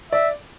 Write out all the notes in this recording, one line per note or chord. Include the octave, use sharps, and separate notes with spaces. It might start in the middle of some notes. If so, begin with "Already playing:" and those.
D5 E5